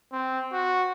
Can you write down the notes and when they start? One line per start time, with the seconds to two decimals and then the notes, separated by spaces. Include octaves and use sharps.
0.12 C4
0.53 F#4